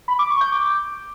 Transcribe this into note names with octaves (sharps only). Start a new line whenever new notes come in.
B5
D6
C#6
G6
D6